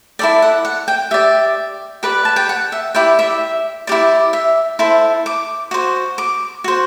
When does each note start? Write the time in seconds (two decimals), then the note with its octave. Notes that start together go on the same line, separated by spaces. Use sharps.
0.19 E4 A4 D5 G5
0.42 F#5
0.65 F#5
0.88 G5
1.11 G4 D5 E5
2.03 G4 B4 D5
2.25 A5
2.36 G5
2.49 F#5
2.72 E5
2.95 E4 G4 D5 G5
3.19 E5
3.87 E4 G4 D5
4.33 E5
4.79 E4 A4 C5
5.26 D6
5.71 F#4 C5
6.18 D6
6.64 F#4 C5